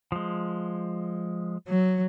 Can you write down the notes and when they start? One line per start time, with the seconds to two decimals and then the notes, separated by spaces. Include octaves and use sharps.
0.12 F3 G#3
1.68 F#3